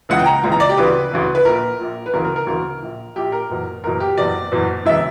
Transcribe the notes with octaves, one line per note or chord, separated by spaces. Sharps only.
C#2 C#3 E3 F#5
G5
A#5
C#2 C#3 E3
A#5
D5
G4
D2 C#3 E3 B4
D2 C#3 E3
B4
A#1 A#2 A#4
A#1 A#2
B4
D2 C#3 E3 A#4
A#4
A#4
D2 C#3 E3 A#4
A#1 A#2
A#1 A#2 G4
A#4
F#1 E2 B2
F#1 E2 B2 A#4
G4
F#1 E2 B2 D5
F#1 E2 B2
E1 C#3 E3 E5